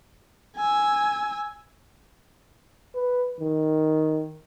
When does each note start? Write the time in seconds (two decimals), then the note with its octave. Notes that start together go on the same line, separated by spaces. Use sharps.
0.57 G#5 E6
2.95 B4
3.41 D#3